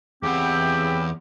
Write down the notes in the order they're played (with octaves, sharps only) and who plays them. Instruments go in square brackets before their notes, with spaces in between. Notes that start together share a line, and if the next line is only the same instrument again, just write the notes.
[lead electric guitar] E2 F#5 [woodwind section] C#3 C4 G4